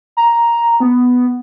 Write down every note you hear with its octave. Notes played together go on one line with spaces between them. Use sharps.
A#5
B3